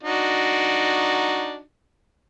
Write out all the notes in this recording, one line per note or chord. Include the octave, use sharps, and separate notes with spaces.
D4 D#4 F#4